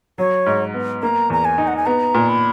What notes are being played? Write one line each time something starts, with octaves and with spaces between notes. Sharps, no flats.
F#3 C#5
G#2
B3
A#3 A#5
E2 A#5
G#5
D#4
F#5
G#5
B3 A#5
A#2
B5